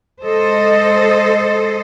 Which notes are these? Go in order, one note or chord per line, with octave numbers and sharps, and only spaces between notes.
G#3 A4 C5 D#5